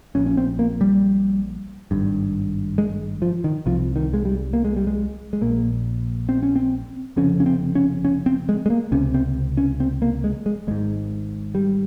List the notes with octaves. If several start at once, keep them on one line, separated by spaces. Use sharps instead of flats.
A#1 A#2 C#4
C#4
C4
A#3
G3
G#1 G2
G#3
F3
D#3
C2 C3 F3
D#3
G#3
G3
A#3
G#3
G3
G#3
G#3
A#1 A#2 A#3
C4
C#4
C4
F1 F2 C#3 C#4
C#4
C4
C#4
C#4
C4
G#3
G#3
A#3
C#2 C3 C#4
C4
C#4
C4
A#3
G#3
G#3
G#1 G#2 G#3
G3